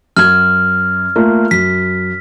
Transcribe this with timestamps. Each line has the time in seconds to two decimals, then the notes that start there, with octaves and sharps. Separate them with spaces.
0.17 F#2 F#4 F6 G#6
1.16 A3 A#3 F4
1.51 F#2 B6